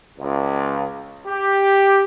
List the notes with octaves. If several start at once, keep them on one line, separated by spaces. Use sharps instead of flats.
C#2
G4